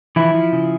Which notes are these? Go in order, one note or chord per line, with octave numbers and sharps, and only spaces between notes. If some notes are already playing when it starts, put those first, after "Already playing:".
E3 F3 E4
F3
C#3